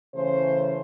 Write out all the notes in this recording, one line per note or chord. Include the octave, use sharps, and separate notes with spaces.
C#3 E3 A3 C#4 C5